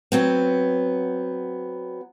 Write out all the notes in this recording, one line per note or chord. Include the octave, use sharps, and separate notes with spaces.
F#3 B3 C4